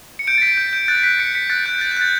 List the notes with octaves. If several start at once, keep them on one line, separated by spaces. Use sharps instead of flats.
C#7
G6 D7
A6
G6 B6
G6
G6
F#6 A6
F#6 B6
G6 C#7
G6 B6
F#6 A6
F#6 G6
F#6 A6
G6
F#6 A6